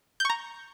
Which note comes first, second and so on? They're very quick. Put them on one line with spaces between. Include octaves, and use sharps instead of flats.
G6 C#6 A#5